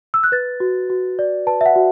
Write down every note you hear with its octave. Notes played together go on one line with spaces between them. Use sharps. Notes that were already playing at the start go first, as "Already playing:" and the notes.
E6
F#6
B4 A6
F#4
F#4
D5
B4 A5
E5
F#5
F#4